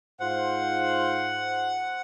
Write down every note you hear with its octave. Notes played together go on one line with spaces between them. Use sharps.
G#2 F4 C5 F#5